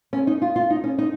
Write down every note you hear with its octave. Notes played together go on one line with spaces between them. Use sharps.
C#4
D#4
F4
F4
D#4
C#4
D#4